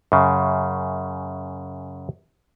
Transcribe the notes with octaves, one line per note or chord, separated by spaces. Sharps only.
F#2 C#3